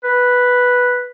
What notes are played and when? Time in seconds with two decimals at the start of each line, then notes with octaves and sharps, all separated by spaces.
0.04 B4